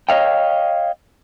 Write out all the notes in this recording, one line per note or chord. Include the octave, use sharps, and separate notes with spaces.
C#5 D#5 F5 G5